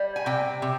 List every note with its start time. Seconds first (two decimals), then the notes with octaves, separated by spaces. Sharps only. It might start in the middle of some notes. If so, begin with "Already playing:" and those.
Already playing: G3
0.16 G#5
0.26 C3 G5
0.62 C3